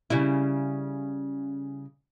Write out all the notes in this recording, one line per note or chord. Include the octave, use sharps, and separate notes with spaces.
C#3 G3 E4